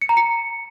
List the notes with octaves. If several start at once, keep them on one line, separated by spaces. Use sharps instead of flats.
C#7
A#5
C#7